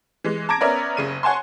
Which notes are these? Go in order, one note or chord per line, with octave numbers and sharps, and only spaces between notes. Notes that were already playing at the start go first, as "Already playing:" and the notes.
E3 G#3
A5 A#5 D6 G#6 A#6 D7
B3 C#4 A#4 D5 E5 A#5
F#1 C#3 D#7
C#5 F#5 G#5 A5 C6